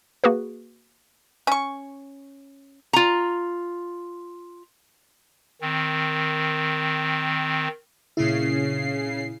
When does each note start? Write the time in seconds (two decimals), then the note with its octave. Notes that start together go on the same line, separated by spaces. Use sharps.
0.24 A#3 F#4 G#4 B4
1.47 C#4 C#6
2.93 F4 A#5
5.61 D#3 C4
8.17 A#2 C#3 E4 C7